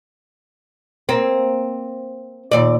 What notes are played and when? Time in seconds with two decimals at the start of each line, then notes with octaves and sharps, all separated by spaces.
1.09 A#3 C4
2.51 D#2 A#2 D5